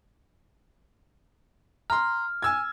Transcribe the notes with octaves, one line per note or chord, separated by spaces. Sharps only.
A#5 C6 F6
G#5 E6 G#6